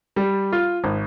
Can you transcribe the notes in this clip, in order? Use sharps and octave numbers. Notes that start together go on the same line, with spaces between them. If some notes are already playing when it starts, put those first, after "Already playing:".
G3
F4
G#1